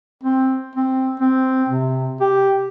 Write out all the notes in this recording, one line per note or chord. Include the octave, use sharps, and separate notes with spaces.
C4
C4
C4
C3
G4